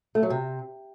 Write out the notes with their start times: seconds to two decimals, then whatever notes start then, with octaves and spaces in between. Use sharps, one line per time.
0.15 A3
0.23 F#3
0.30 C3